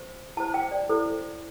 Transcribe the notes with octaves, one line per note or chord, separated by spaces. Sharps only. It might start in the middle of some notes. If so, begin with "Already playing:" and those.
Already playing: C5
E4 C5 A5
G5
D5
E4 A4 C5